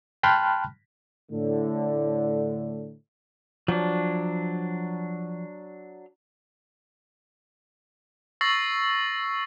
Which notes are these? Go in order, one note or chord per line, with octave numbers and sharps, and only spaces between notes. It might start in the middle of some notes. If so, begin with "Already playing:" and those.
G5 A5 B5 C6 F6 F#6
A2 D3
F3 F#3 D4
C#6 E6 A6 A#6 C7 F#7